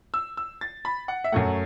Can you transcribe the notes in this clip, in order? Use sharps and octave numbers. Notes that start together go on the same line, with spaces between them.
E6
E6
A6
B5
F#5
E5
F#2 F#3 A3 F#5